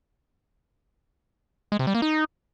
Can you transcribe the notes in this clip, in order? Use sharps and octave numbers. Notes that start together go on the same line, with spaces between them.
G#3
C3
G3
A#3
D#4